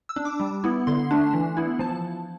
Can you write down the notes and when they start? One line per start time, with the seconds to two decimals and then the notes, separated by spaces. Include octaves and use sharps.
0.09 E6
0.16 D4
0.25 D6
0.40 G3
0.64 B3 E4
0.87 D3 C6
1.11 A3 D4
1.33 E3
1.57 B3 E4
1.79 F3 A5